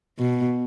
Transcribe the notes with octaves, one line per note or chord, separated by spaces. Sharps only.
B2